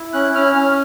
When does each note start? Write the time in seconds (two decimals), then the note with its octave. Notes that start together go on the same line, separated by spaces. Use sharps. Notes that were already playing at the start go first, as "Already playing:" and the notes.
Already playing: E4
0.13 C#4 F#6
0.35 C#4 F6
0.55 C#4 F6